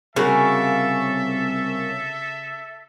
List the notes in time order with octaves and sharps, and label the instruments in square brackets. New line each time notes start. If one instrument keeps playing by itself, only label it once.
[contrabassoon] C2 [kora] C#3 F#4 [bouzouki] A#3 C#4 [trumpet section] A4 E5